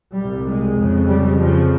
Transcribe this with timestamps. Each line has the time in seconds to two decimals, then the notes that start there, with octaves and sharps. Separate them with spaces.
0.14 C2 A#2 G3
0.46 G#3
0.77 F2 C#3
1.09 G3
1.40 F2 C#3 F3